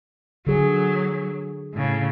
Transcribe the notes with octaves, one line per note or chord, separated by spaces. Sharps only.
D3 F#3 G#4
A2 C#3